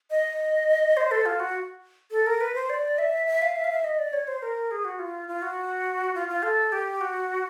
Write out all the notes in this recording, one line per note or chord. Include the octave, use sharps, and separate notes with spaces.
D#5
C5
A4
F4
F#4
A4
A#4
B4
C5
D5
E5
E5
F5
E5
F5
E5
D#5
D5
C#5
C5
A#4
G#4
F#4
F4
F4
F#4
F4
F4
A4
G4
F#4